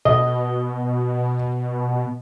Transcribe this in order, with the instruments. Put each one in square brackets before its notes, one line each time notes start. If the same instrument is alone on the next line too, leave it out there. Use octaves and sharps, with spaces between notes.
[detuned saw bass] B2 [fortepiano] D#5